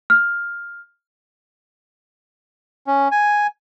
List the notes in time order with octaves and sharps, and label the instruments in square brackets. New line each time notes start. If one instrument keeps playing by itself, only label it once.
[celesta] F6
[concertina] C#4
G#5